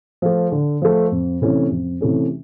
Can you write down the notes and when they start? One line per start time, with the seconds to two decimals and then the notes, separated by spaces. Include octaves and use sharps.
0.22 F3 A3
0.52 D3
0.82 F3 A3
1.12 F2
1.42 C3 E3 A3 C#4
1.71 F2
2.01 C3 E3 A3 C#4